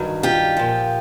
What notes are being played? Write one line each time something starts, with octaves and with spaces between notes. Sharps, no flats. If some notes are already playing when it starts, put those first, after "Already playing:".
Already playing: G2 D#3 F#3
F4 G4
A#2 F3